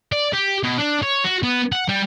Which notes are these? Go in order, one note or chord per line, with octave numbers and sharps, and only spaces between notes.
D5
G4
B2
D4
C#5
F#4
B3
F#5
G3